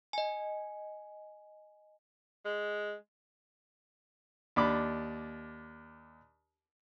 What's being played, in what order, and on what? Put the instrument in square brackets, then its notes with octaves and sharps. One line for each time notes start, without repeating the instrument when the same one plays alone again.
[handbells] D#5 G#5
[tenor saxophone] G#3
[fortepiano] D#2 D4 B5 D6